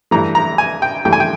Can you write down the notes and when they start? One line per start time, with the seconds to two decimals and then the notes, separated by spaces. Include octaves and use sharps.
0.11 G2 E3 A3 A#5
0.35 A#5
0.58 G#5
0.82 G5
1.05 G2 E3 A3 G5
1.13 G#5
1.20 G5